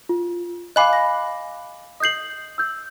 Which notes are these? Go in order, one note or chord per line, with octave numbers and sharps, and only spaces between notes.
F4
D#5 F5 G#5 B5 D6 F#6
A#6
D#5 D#6 G6 C7 F#7
E6 G6